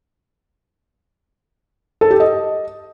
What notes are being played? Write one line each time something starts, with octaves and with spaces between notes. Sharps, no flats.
A4
G4
D#5